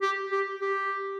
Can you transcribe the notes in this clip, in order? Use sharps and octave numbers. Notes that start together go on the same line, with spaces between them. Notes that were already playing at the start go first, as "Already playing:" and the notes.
G4
G4
G4